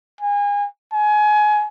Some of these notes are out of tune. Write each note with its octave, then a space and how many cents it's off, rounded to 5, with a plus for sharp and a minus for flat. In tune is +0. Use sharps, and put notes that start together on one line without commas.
G#5 -30
G#5 +25